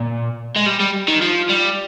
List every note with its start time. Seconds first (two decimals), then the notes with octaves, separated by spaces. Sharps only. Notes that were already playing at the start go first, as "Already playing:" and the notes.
Already playing: A#2
0.56 G#3
0.66 G3
0.80 G3
1.08 D#3
1.22 F3
1.49 G3